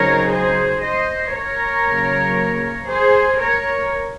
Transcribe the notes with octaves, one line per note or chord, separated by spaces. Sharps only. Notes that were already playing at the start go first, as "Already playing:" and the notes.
Already playing: C#3 F#3 C4 D#4 A#4 C#5
G#4 C5
C5 D#5
A#4 C#5
C#3 F#3 A#3
G#4 C5
A#4 C#5